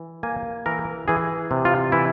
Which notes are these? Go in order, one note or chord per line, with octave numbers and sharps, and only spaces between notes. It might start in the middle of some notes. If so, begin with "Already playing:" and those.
Already playing: E3
A#3 G#5
E3 A#4
E3 G#4
C3
F4
E3 E4